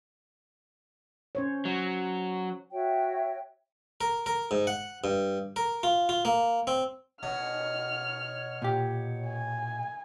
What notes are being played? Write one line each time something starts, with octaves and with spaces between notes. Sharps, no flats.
C#4 C5 C#5
F#3
F#4 C#5 E5 G5
A#4
A#4
G#2
F#5
G2
A#4
F4
F4
A#3
C4
B2 C#5 F6
A#2 G4
G#5